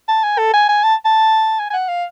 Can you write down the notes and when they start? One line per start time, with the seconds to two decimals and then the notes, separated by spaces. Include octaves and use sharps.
0.08 A5
0.24 G#5
0.38 A4
0.53 G#5
0.69 G#5
0.84 A5
1.05 A5
1.59 G#5
1.70 G#5
1.73 F#5
1.89 F5